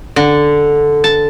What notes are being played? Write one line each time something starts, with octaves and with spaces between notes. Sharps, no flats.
D3
A5